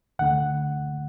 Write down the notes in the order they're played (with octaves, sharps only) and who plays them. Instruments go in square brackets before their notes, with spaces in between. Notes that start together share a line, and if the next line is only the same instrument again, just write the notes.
[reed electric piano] D2 D3 A3 F#5